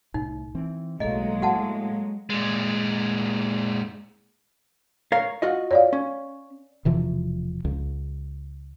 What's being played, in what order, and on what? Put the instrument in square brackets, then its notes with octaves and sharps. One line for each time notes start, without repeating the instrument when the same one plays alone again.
[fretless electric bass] C2 A2 [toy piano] D#4
[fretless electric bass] E3 C4
[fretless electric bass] B1 A2 [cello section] F#3 G#3 [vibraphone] A#3 A4 F5 [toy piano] D#5
[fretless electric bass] A2 [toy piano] F#4 F#5 A5
[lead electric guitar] A#2 G#3
[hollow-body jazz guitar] A#4 C#5 F5
F4 F#4 D#5
[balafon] C#5 D5 F5
[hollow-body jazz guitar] C#4
[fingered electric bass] E1 C3 E3 F3
C#2